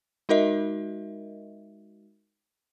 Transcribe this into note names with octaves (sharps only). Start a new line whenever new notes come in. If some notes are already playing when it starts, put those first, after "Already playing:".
G#3 D#4 F#4 A#4 D#5 E5